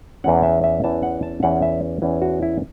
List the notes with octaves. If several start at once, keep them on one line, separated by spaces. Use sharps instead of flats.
E2 E3 C#4 F#5
E5
E5
E2 E3 C#4 A5
F#5
A5
E2 E3 C#4 F#5
E5
E2 E3 C#4
F#4
E4